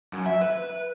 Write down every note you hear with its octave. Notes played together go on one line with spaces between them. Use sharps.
F#2
E5
B4